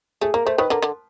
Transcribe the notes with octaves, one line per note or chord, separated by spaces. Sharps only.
A3 G#4
A#3 A#4
A3 C5
D#3 B4
D3 A#4
D3